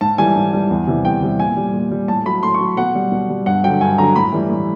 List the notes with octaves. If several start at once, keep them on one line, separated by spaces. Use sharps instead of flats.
G#2 A5
E3 G3 G#5
G#2
E3 G3
E2
C3 E3 G3
E2 G5
C3 E3 G3
A#2 G#5
G3
A#2
G3
A2 A5
F#3 B5
A2 C6
C#6
F#3
B2 F#5
G3
B2
G3
G2 F#5
D3 F#3 G5
G2 G#5
D3 F#3 A#5
A2 B5
E3 G3
A2